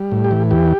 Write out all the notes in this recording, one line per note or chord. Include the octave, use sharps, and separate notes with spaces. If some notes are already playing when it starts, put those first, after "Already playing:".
Already playing: G3
A2
G4
E3
E2 G4